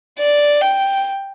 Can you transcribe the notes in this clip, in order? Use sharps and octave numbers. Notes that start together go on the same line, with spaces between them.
D5
G5